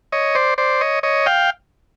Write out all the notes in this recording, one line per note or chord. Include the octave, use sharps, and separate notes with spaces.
C#5 D#5
C5 D5
C5 D5
C#5 D#5
C#5 D#5
F5 G5